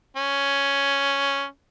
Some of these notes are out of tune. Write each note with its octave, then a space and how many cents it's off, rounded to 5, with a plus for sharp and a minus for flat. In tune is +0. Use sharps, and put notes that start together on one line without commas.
C#4 +5